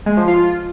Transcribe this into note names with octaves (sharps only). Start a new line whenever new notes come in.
G#3
F3
F4